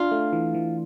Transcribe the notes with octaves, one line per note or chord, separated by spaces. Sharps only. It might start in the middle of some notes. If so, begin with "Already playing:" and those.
Already playing: D4 F4
A3
E3
E3